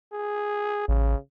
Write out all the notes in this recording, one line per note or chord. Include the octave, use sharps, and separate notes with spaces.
G#4
A1 C#3